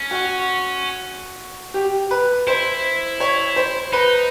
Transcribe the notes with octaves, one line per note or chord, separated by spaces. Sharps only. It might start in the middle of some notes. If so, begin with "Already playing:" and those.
Already playing: C#4
F#4
G4
B4
E4 C5
C#5
C5
D#4 B4